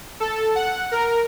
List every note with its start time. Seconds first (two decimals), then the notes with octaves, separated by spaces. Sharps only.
0.20 A4
0.55 F#5
0.92 A#4